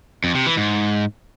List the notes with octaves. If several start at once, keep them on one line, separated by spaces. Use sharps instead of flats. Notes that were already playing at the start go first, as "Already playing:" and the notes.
F2
C3
E3
G#2